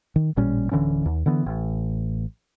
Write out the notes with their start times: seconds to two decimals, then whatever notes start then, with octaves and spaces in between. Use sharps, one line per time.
0.16 D#3
0.37 A1 A#2 G3 C#4
0.71 D1 D3 E3 C#4
1.05 D#2
1.26 D3 E3 B3
1.46 A1